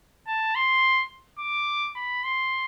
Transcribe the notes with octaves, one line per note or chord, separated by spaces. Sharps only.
A5
C6
D6
B5
C6